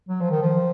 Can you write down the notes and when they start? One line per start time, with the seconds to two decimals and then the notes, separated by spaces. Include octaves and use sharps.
0.09 F#3
0.21 F3
0.31 D#3
0.43 F3